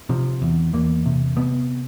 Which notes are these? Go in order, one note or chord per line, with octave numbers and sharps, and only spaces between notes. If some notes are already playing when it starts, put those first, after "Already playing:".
C3 F3
E2
E2 A#3
C3
C3 B3